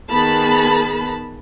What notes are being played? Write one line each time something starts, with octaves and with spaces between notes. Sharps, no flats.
D#3 B3 G#4 A5 B5